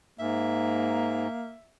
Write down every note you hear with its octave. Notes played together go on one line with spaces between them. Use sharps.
G#2 A#3 E5